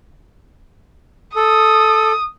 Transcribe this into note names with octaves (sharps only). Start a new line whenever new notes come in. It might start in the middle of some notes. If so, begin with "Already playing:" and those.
A4 D#6